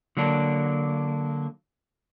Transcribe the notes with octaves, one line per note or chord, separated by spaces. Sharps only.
D3 F#3 A#3 D4